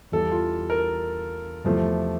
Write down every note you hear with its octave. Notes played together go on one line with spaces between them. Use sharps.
E2 E3 G3 A4
F4
A#4
E2 C3 F3 A3